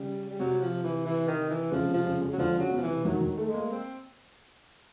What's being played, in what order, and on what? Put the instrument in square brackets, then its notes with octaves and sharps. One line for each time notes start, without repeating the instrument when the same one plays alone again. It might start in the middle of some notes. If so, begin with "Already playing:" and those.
Already playing: [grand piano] C#3 [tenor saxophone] G3
[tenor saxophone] G3
[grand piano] C3 [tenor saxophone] F#3
[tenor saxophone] F3
E3
E3
D#3
E3
[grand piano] C#3 [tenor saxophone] F3
[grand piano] C3
[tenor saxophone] F3
[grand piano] C#3
C#3
[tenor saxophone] F#3
[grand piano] D3 [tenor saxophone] F3
[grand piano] C#3 [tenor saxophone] F#3
[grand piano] B2
[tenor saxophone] F3
E3
[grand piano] C3
[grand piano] D#3 [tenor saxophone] F#3
[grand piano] D#3
A3
[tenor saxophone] G#3
[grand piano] A#3
[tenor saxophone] C4